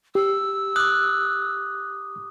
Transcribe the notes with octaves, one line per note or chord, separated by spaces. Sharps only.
G4 E6
D6 D#6 F#6